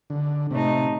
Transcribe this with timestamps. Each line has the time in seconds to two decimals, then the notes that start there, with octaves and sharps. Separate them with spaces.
0.10 D3
0.51 A2 C3 A3 D#4